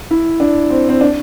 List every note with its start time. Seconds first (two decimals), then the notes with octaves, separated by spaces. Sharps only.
0.11 E4
0.40 D4
0.70 C4
0.89 C4
1.01 D4